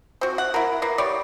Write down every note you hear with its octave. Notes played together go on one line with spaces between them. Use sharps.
C4 F#4
F#5
E4 A#4
A#3 B3
G3 C#5 D5